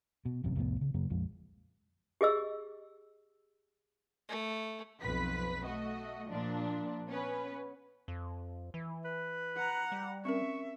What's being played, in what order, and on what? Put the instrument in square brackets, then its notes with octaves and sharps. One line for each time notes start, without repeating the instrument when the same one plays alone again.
[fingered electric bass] B2
E1 A1 F#2 C3
C2 F2 A2 B3
C#3
F#2 C#3 F#3 A#3
A#1 F2 F3 G#3
[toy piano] G4 G#4 D#5 E6
[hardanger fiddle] A3
[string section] B1 F2 B4 B6
A3 F#4 D#5
A#2 F3 D4
B3 C#4 B4
[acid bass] F2
E3
[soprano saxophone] B4
[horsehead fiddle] F#5 A#5
[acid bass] G3
[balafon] C4 C#4 A#4 [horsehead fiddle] E5 [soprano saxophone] C#6